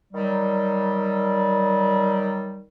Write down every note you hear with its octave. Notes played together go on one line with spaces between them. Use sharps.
D#3 F#3 G3